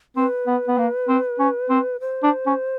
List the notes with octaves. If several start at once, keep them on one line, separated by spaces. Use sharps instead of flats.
C4 B4
B3
B3
A#3
C4
C#4
C4
C5
D4
C#4